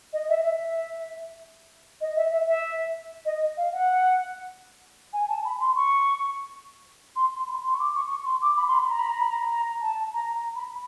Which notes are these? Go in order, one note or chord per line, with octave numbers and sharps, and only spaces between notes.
D#5
E5
E5
E5
D#5
E5
E5
E5
D#5
F5
F#5
G#5
A5
B5
C6
C#6
C6
C6
B5
C6
C#6
D6
C#6
C#6
C6
D6
B5
C6
B5
A#5
B5
A#5
B5
A#5
A#5
A5
A#5
A#5
B5